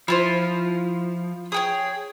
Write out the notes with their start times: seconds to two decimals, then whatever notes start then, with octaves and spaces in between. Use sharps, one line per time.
0.08 F3 E4 F4 C5
1.52 G#4 C#5 G5 D#6